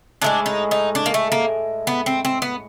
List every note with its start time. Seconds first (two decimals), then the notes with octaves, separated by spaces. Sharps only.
0.22 A2 E3 G#3 D4
0.46 D#4
0.71 D#4
0.95 D4
1.06 A#3
1.14 A3
1.32 A#3
1.87 B3
2.06 C4
2.25 C4
2.42 B3